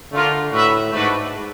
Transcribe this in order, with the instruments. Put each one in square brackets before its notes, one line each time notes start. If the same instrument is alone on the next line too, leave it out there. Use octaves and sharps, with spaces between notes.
[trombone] D3 [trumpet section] A3 D4 F4 A#4
[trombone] A2 [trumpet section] F#4 B4 E5
[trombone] G#2 [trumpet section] A3 D4 F#4 B4